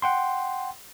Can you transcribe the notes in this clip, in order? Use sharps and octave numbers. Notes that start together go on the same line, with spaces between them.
F#5 G5 C6